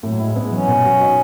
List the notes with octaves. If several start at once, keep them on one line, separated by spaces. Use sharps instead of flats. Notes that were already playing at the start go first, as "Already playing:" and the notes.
A2 F#3
G#3 E4
G#3 B3
F#3 C#4
B2
F#4
D#4